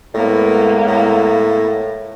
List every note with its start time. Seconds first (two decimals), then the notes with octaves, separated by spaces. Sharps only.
0.14 A2 G#3 A#3 B3
0.87 A2